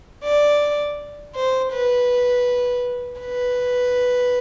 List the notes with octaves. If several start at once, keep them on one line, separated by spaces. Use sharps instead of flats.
D5
C5
B4
B4